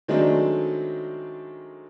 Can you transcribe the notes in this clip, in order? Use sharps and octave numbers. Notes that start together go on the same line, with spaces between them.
D#3 F#3 G#3 A3 C4 D4